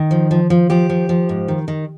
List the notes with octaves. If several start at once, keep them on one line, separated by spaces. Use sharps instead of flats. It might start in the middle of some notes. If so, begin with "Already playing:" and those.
Already playing: D#3
F3
F3
F3
F3 G4
F3
F3
G#2
D#3
D#3